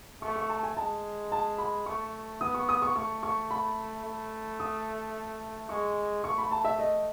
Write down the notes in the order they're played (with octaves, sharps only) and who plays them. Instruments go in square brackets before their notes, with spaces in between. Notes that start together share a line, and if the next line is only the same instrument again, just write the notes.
[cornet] A3 [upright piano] C#6
[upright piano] C#6
A5
G#5
[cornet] G#3 [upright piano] A5
[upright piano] A5
B5
[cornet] A3 [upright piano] C#6
[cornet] B3 [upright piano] D#6
[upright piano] C#6
D#6
C#6
[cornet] A3 [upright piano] C#6
[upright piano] C#6
B5
[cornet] A3
[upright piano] D#6
[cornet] G#3 [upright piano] C#6
[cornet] A3 [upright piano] C#6
[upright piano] B5
A5
E5
D#5